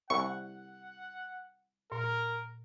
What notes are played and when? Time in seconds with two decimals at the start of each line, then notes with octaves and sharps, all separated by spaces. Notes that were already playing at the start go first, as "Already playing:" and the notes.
0.10 C2 E4 F#5 C#6
1.92 A#2 A#4